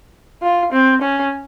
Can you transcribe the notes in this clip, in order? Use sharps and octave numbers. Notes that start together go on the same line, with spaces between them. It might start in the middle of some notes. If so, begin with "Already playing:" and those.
F4
C4
C#4